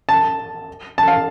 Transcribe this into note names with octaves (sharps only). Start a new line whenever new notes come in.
A5
A5
F5